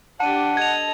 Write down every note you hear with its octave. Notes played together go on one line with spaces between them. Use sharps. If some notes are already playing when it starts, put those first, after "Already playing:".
D4 G4 F#5 A5 D#7
A4 D#5 G#6 F7